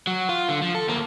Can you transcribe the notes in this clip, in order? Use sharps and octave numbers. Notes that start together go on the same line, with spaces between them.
F#3
F4
D3
F3
A4
D2 A#3